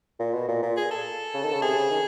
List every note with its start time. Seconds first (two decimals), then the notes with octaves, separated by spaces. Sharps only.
0.20 A#2
0.34 B2
0.48 A#2
0.63 A#2
0.77 G#4
0.91 A4
1.34 C#3
1.43 D#3
1.52 C#3
1.62 C3 G#4
1.76 C#3
1.90 D#3